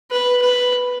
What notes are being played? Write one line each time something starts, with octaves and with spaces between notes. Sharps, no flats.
B4
B4